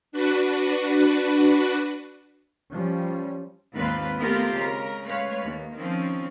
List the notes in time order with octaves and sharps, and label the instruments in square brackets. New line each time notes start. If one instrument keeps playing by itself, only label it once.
[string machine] D4 F#4 B4
[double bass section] F3 G3 C#4
[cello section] D#2 G#2 A#3 C4 F4 B4
A3 B3 C4 F4 G4 A#4
C#3 G#3 A#4
G#3 A3 B4 C#5 F5
D#2 A#3
D#3 F3 C4 C#4